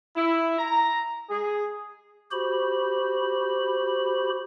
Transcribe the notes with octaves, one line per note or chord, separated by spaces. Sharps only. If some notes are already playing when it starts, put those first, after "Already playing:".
E4
A#5
G#4
F#4 G4 C5 B5